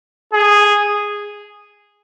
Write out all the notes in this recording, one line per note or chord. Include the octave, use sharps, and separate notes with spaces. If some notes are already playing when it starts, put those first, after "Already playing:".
G#4